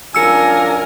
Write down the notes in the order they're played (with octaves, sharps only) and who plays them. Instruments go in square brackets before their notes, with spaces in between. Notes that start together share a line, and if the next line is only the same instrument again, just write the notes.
[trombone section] F#2 D4 F4 [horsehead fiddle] A#4 G#5 [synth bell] E6 C#7